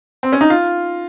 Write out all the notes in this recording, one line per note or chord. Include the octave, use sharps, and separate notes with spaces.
C4
C#4
D#4
F4